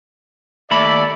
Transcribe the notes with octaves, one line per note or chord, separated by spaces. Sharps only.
D#2 A3 D5 E5 B5